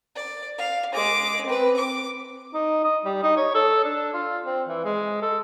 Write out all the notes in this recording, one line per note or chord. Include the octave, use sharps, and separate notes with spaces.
D5
F5
G#3 D6
C4 B4
D6
D#4
D#5
G3
D#4
C#5
A4
D4
F4
C4
E3
G#3
A4